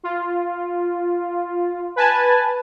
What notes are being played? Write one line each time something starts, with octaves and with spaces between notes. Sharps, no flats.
F4
B4 G#5 A5